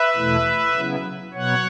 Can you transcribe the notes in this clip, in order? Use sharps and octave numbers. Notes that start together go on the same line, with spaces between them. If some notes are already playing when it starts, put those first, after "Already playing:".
Already playing: B4 E5
E2 B2 A3 E4
C#3 F#3 B3 E4
B2 F#3 B3 C#5 F#5